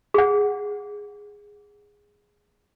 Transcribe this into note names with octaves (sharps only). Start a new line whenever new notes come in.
G#4 F#5